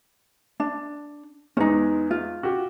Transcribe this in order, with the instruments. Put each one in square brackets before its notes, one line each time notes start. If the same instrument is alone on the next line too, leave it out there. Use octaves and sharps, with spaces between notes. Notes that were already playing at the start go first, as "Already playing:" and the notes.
[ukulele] D4
[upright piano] E2 G#3 [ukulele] C#4 D#4
[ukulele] F4
[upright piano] F#4 G4